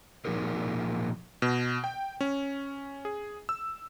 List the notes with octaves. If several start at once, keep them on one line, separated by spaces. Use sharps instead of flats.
A#2 F3 D#4 G#4 A#4
B2
G5
C#4
G#4
E6